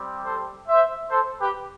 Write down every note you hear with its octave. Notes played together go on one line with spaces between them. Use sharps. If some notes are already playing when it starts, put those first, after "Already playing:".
Already playing: G3 C4 G4
A4 C5
C5 E5
A4 C5
G4 B4